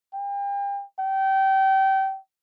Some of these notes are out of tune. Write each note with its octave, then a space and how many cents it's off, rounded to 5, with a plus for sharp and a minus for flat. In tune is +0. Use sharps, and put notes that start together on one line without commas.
G5 +40
G5 -25